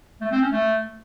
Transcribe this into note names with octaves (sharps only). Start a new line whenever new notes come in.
A3
C4
C#4
A3